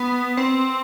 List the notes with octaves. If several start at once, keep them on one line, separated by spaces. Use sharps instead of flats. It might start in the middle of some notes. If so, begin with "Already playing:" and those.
Already playing: B3
C4